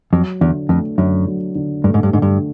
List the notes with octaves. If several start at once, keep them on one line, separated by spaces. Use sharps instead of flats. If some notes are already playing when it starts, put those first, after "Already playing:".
F2 F#3
E2 D3
F2 A3
F#2 D3
F#3
D3
G2 A3
G#2
G2
G#2 D3
G2